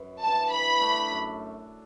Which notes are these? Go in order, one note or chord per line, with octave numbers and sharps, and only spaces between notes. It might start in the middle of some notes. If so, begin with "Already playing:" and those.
Already playing: F#2 F#4 B4
E3 G3 D4 A5
E3 B5
A3 D4 A4
F#2